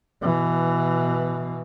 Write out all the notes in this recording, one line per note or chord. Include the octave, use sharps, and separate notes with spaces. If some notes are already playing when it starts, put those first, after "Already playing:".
B2 E3